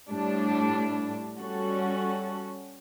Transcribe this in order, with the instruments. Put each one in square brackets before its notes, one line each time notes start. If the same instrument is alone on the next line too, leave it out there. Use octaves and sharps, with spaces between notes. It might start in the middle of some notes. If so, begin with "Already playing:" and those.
[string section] A2 G3 D4
G3 C#4 F#4 A4